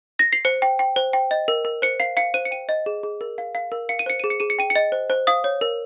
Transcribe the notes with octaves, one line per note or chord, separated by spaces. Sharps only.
A#6
C7
C5 C#7
G5
G5
C5
G5
D#5
A#4
A#4
C5 C#7
F5 C7
F5 C#7
C5 D#7
C#7
G5 D#7
D#5
G#4
G#4
A#4
F5
F5
A#4
F5 C#7
D#7
C5 C#7
G#4 D#7
C#7
G#4 D#7
C#7
G5 D#7
C#7
D#5
C5
C5
F5 D#6
C#5
A#4